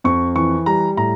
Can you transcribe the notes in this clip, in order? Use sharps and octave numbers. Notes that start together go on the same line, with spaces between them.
F2 C#6
E3 C#6
G3 A#5
A2 A#5